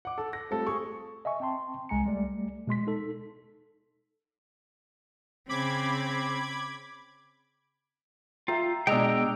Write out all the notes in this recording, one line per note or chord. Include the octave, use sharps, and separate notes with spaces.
F#5 D6
A4
A#6
G3 A3 C4 F4 A4
G#4 C#6
D#5 E5 G#5 C#6
C4 G5 A5 C6
C2 G#3 G#5 A#5 C#7
G3 A3 D5
B2 G#3 C6 B6
D#4 A4
C#3 C4 B5 D6 G#6
F4 E5 G5 A#5
B2 G#3 D4 D#5 G5 A#5 E6